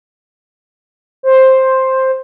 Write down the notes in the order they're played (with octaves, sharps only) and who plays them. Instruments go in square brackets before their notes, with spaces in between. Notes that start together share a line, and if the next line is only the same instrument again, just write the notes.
[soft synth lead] C5